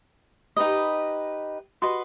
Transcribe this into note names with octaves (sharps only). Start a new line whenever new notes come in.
D#4 G4 B4 D#5
F#4 B4 D#5 C6